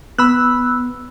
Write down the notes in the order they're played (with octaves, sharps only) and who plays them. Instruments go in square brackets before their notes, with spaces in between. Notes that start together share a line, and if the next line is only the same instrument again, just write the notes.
[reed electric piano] B3 [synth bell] B5 E6 F#6